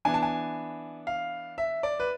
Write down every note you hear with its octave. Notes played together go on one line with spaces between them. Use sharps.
E3 B3 D4 G#5
A5
G#5
F5
E5
D5
B4